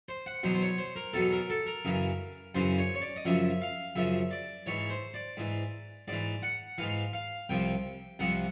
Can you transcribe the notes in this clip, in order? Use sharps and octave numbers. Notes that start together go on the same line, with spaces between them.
C5
F#5
E2 B2 F#3 C5
C5
C#5
C5
A#4
E2 B2 F#3 A4
A#4
A4
A#4
F#2 C#3 E3
F#2 C#3 E3 C5
C#5
C#5
D5
D#5
F#2 C#3 F3 E5
F5
F#2 C#3 F3 E5
D5
G#2 E3 C#5
C5
D5
G#2 E3
G#2 E3 D5
F#5
G#2 E3 F5
F5
C2 C3 F3 G5
C2 C3 F3 F#5